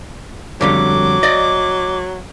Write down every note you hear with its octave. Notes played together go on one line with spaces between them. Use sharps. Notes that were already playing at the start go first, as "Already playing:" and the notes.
F2 D3 F#3 G3 D6
D5 D#5